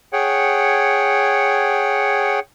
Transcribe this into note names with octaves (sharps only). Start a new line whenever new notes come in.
G#4 C#5 F#5 G5